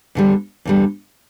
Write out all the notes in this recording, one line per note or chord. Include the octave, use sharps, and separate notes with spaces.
E2 D3 G3
E2 D3 G3